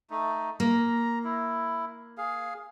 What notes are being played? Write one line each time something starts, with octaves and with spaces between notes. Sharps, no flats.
A3 D#4
A#3 A#5
E4
G#4 F5